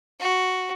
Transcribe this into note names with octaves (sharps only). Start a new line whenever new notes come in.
F#4